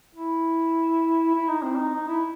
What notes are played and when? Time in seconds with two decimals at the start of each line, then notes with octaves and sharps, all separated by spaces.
0.15 E4
1.35 E4
1.49 D#4
1.63 C4
1.76 D#4
1.95 D#4
2.08 E4